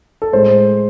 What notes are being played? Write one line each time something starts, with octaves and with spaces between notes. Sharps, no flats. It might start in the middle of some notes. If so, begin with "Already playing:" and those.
A4
A2 G#3 C5